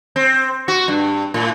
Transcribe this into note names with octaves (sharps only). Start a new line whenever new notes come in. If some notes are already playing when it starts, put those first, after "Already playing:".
C4
F#4
G2
A2